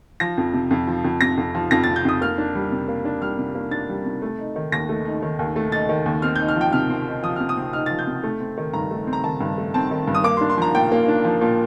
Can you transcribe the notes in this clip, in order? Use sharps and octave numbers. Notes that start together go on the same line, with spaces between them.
F3 A#6
F2
C3
F2
F3
F2
C3 A#6
F2
F3
F2 A#6
C3 A6
G6
F2 D#6
A#3 F6
D4
G3
C3
A#3
D4
G3 F6
C3
A#3
D4 A6
G3
C3
A3
D#4
D#3
D#2 A#6
A3
D#4
D#3
D#2
A3
D#4 A6
D#3
D#2
C4 F6
D#4 G6
F6
F3 G5
C3 F6
C4
D#4
F3 D#6
C3 F6
D#6
C4
D#4 F6
F3 A6
G6
C3
A3
C4
D#3
G2 A#5
A3
C4
A#5
D#3 A5
G2
A3
C4 A5
D#3
G2
D#6
A#3 D6
C6
D4
C6
F3 A#5
A#2 G5
A#3
D4
F3
A#2